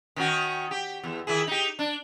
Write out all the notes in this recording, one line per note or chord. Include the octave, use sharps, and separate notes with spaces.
D#3 C#4 F#4
G4
E2
D#3 E4 G#4
D#4 G4
D4